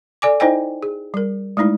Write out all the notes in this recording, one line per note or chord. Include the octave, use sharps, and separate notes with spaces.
A4 D5 G#5 D6
D#4 E4 C5 D#5 G5 G#5
G#4
G3 A#4
G#3 A3 D#4 E4